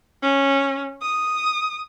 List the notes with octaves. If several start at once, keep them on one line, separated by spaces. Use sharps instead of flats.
C#4
D#6